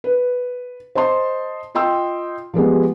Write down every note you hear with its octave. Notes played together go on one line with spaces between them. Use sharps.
B4
C5 D#5 A5 C6
F4 D#5 G5 C6 E6
F3 G3 G#3 B3